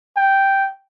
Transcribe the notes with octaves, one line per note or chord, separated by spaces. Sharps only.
G5